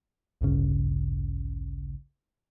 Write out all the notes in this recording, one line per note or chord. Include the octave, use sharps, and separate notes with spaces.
A1 D2 G2 C#3